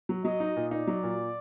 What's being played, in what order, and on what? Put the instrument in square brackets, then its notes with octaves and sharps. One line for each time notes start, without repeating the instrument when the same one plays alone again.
[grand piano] F#3
[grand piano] F#3 [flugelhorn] D#5
[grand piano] D#4
A#2
[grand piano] D#4 [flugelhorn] D5
[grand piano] F#3
A#2